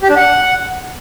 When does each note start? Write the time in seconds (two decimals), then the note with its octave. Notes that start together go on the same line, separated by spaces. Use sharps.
0.03 G4
0.09 D4
0.16 F#5